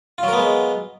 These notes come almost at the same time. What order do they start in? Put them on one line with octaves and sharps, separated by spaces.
F4 F#3 A#4 B3 G#3